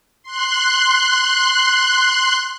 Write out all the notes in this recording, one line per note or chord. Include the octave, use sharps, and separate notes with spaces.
C6 F#6